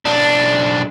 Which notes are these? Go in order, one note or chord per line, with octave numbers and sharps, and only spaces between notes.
B1 D4